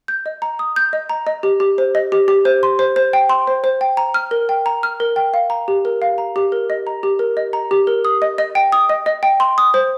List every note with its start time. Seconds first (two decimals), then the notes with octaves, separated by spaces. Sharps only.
0.08 G6
0.26 D#5
0.42 A#5
0.59 D#6
0.76 G6
0.93 D#5
1.09 A#5
1.27 D#5
1.43 G4
1.60 G4
1.78 C5
1.95 D#5
2.12 G4
2.28 G4
2.45 C5
2.63 C6
2.79 C5
2.96 C5
3.13 G5
3.30 C6
3.47 C5
3.64 C5
3.81 G5
3.97 A#5
4.14 F6
4.31 A#4
4.49 G5
4.66 A#5
4.83 F6
5.00 A#4
5.16 G5
5.34 F5
5.50 A#5
5.68 G4
5.85 A#4
6.02 F5
6.18 A#5
6.36 G4
6.52 A#4
6.70 D#5
6.87 A#5
7.03 G4
7.19 A#4
7.37 D#5
7.53 A#5
7.71 G4
7.87 A#4
8.05 D#6
8.22 D#5
8.38 D#5
8.55 G5
8.72 D#6
8.89 D#5
9.06 D#5
9.23 G5
9.40 C6
9.58 D#6
9.74 C5